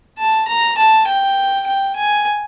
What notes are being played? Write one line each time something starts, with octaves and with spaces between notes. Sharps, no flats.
A5
A#5
A5
G5
G5
G#5